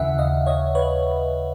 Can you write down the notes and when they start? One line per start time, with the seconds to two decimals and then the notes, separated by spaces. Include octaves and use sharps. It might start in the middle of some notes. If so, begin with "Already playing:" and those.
Already playing: D#2 C#3 E3 E5 F#5
0.18 D#5 F5
0.46 C#5 D#5
0.75 B4 C#5